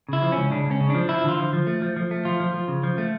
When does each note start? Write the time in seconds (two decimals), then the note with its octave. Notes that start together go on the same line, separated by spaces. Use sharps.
0.09 C#3 E4
0.22 F3
0.32 C#2 C#4
0.51 C#3 D4
0.65 C#2
0.71 C#4
0.80 C#3
0.90 F3 D4
1.09 F3 E4
1.24 D3 F4
1.38 F3
1.53 F3
1.67 A3
1.82 F3
1.96 F3
2.11 A3
2.25 F3 F4
2.40 F3
2.54 F3
2.68 C#3
2.83 F3
2.98 A3